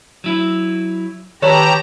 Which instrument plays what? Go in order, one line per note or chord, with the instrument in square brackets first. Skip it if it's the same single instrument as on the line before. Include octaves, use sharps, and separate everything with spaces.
[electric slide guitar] F#3 E4
[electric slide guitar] D#3 A4 B4 [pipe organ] G4 A#5 [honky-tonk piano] C#5